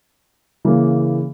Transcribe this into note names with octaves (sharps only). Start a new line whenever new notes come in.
C#3 E3 A#3